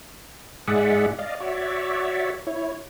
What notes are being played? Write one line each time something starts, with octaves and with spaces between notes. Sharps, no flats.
G#2 G#3 G#4 D5 E5 F#5
D5 D#5 F5
F#4 C#5 D5 E5
E4 C#5